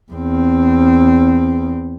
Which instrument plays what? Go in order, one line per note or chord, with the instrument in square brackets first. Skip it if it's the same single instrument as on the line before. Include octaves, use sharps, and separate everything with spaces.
[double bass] E2 C4